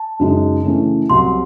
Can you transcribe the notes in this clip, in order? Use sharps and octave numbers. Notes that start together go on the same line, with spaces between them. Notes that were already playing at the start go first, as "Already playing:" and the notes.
Already playing: A5
F#2 C#3 G#3 D#4
C#3 E3 A3 C#4
C2 C3 F#3 C6